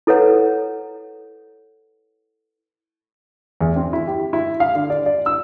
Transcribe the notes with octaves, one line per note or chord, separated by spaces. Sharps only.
E4 A4 B4 C#5 F#5 A#5
E2
C4
E4
G4
E4
F5
D3
D5
D5
E6